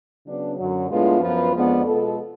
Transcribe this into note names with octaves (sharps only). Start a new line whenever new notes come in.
C#3 F#3 B3 D4
F#2 D3 F#3
A2 G#3 B3 D4 F4
F#2 F3 B3 F4 B4
F2 F3 G#3 B3 D4
B2 G#3 B3 F4 A4